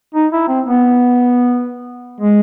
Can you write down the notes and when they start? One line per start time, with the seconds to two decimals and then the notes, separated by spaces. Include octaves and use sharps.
0.15 D#4
0.32 E4
0.49 C4
0.67 B3
2.21 G#3